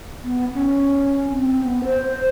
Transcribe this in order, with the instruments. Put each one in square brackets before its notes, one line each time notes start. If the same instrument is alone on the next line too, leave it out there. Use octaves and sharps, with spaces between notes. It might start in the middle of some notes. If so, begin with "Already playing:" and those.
[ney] B3
C#4
C4
B3
C5